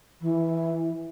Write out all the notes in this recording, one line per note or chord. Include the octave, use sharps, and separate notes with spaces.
E3